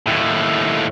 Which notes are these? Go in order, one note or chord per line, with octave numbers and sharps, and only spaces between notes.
D#2 A2